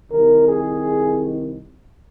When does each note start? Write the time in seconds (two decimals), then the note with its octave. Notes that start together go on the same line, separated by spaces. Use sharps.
0.11 C2 C3 D#3 A#4
0.47 G#4